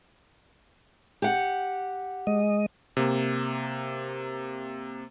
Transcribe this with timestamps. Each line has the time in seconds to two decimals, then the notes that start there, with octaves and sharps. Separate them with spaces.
1.22 G4 F#5
2.27 G#3 D#5
2.97 C3 A#3